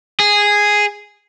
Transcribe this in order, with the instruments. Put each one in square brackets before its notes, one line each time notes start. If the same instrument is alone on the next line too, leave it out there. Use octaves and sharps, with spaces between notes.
[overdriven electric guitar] G#4